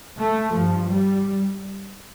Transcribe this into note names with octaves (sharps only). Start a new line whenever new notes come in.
A3
G2 F3
G3